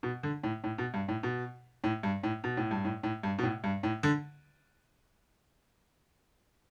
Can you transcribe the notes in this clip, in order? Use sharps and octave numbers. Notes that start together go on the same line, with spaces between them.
B2
D3
A2
A2
B2
G2
A2
B2
A2
G2
A2
B2
A2
G2
A2
A2
G2
B2
A2
G2
A2
D3